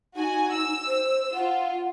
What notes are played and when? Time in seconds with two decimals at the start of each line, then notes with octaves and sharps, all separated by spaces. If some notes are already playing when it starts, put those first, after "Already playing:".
0.17 D#4 F#4 G#5
0.54 E6
0.87 C5
1.34 F4 F#5